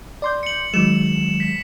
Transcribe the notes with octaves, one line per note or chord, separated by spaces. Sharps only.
D5 C6 G6
C#7 F#7
D#3 F#3 G#3 E7
B6